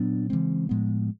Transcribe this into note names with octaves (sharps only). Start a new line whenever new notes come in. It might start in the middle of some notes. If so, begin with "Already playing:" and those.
Already playing: A#2 F#3 B3 D4
C#3 E3 G#3 C4
A2 F3 G#3 B3